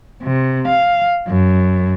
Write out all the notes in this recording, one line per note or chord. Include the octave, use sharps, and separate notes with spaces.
C3
F5
F#2